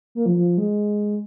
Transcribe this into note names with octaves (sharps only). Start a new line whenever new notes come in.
A#3
F3
F3
F3
G#3